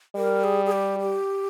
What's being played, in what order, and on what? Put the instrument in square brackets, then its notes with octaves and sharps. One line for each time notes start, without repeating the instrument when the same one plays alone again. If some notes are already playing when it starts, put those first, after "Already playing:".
[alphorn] G3 [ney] A#4
[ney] G#4
G#4
G4
G4